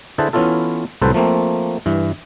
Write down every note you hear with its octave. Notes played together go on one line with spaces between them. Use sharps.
D3 E4 G#4 B4 C5 A5
E3 B3 C#4 E4 F4 A4
C2 A2 F#3 A4 B4 C5
F3 A3 A#3 C4
G2 E3